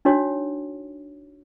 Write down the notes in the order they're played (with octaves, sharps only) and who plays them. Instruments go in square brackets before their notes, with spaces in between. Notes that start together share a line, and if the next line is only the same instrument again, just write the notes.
[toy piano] D4 D#4 F#4 C#5